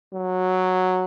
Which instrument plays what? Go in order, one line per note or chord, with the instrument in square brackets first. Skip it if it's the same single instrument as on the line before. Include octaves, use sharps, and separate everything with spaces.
[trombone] F#3